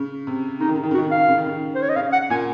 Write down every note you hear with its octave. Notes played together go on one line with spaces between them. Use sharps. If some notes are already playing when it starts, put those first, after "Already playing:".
Already playing: C#3
C3
C#3 D#4
D#3
C#3
D#3
C#3
F#4
D#3
C#3
F5
C#3
D#3
C#3
C5
C#5
D#5
C#3 F5
F#5
A#2 G#5